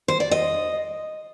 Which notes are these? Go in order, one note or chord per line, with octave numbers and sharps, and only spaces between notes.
C5
D5
D#5